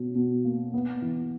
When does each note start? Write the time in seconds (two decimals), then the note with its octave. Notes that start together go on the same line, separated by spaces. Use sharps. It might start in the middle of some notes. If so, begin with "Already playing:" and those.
Already playing: B2 C#4
0.15 B2
0.44 A#3
0.74 B3
1.02 E3